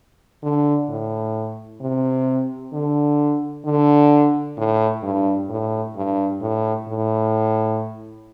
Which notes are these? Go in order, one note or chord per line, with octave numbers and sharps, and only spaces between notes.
D3
A2
C3
D3
D3
A2
G2
A2
G2
A2
A2